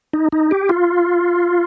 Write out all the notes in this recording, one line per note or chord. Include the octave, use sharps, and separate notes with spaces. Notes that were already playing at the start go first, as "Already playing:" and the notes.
D#4
D#4
G4
F4